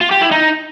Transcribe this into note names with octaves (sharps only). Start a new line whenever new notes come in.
F4
G4
E4
D#4